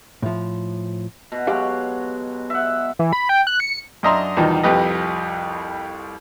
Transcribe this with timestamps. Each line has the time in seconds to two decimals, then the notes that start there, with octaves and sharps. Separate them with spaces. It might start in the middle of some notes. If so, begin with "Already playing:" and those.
0.22 A2 F3
1.32 B2
1.47 F#3 G#3 G4 F5
2.50 E5 F#5
2.99 E3
3.13 B5
3.29 G5
3.47 F#6
3.60 C#7
4.03 F#2 D4 D#5 E5 A#5 C6
4.37 E2 B2 D#3 F3 G3 D#4
4.63 C2 F2 G4 B4 D#5